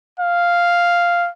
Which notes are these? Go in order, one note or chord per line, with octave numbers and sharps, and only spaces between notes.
F5